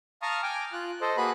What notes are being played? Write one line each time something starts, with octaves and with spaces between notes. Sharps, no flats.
F5 A5 A#5 C#6 D#6 F6
G5 G#5 D6 F6
F4 F#6
A4 C5 D#5
A#3 F#4 G#4 B4 B5 F#6